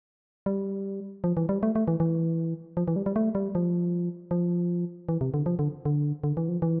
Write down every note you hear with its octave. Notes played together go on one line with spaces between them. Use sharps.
G3
F3
E3
G3
A3
A3
E3
E3
F3
E3
G3
G3
A3
G3
F3
F3
E3
C3
D3
F3
D3
D3
D3
E3
F3
E3